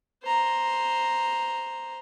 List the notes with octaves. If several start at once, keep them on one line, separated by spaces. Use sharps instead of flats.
C5 A#5